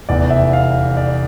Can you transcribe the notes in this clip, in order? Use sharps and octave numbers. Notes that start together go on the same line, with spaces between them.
F1 E2 E3 D5
E5
F5
D5